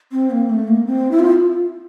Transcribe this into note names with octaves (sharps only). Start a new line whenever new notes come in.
C4
A#3
A3
A#3
C4
E4
F4